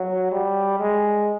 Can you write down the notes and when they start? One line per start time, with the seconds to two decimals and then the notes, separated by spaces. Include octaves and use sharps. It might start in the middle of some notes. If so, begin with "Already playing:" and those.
Already playing: F#3
0.32 G3
0.79 G#3